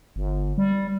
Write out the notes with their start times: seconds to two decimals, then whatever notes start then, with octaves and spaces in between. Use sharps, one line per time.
0.16 G1
0.58 G3